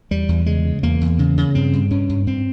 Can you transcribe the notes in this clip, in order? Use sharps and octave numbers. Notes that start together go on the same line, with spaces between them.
E2 G3
E2
C#3 G#3
C#3
E2 A#3
E2
C#3
C#3
G2 C4
G2
G2 C#4
G2
G2 C4